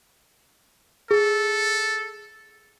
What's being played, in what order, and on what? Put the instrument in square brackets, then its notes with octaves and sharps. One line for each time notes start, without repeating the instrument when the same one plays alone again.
[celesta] G#4 [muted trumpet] A4